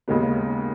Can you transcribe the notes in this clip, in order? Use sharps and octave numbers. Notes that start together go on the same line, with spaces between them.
D#2 C#3 G#3 B3